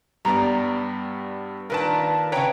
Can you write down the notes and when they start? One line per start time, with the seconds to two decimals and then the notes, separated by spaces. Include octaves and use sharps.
0.25 G2 G3 B3 D5 A#5
1.70 A#2 D#3 D4 A#4 B4 A5
2.32 C#3 B4 C#5 G5 A#5